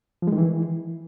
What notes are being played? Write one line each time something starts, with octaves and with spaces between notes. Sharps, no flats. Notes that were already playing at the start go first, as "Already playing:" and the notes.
F3
G#3
D#3
E3